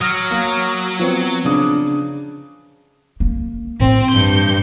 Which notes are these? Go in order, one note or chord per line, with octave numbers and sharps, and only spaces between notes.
F#3 D#6 F6 A#6
A#3
F3 B3 C4
C#3 D4 D#6
A#3
A2 E3 C4
G2 G6